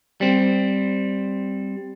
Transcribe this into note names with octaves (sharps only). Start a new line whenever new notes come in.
G3 C4